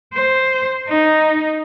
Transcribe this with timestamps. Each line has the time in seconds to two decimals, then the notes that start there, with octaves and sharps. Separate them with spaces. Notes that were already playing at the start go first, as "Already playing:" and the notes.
0.14 C5
0.88 D#4